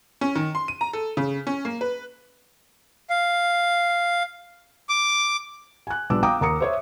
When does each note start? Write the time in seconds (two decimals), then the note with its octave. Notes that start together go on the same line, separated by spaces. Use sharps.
0.21 C#4
0.35 D#3
0.55 C6
0.68 D#7
0.81 A#5
0.93 A4
1.17 C#3
1.47 C#4
1.65 A#3
1.81 B4
3.10 F5
4.89 D6
5.87 G#5 F#6
6.10 A#1 G3 B3 D4 D6 E6
6.23 F5 G5 A#5 D6 D#6
6.41 D#2 A#4 A#5 D#6 C#7
6.60 C5 C#5 E5